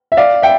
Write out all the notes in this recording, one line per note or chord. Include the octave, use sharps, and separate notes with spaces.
E5
D5 F5
E5 G5